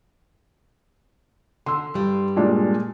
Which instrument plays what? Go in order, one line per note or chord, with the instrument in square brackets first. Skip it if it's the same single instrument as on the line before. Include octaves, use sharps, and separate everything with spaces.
[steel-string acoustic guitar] D3 [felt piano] C6 E6
[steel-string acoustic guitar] G2 G3
[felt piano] A#2 G#3 D4